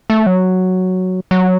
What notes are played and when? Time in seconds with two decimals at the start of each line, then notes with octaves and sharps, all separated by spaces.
0.10 A3
0.26 F#3
1.31 F#3